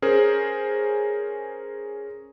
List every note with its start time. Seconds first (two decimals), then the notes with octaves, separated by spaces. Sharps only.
0.02 C#4 G#4 A#4 C5